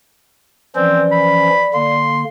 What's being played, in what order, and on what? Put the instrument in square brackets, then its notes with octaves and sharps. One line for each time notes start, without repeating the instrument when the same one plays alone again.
[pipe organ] E3 F3 C#4 [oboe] C4 [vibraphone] D5
[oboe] B5
[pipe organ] D3 A#3 [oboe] C6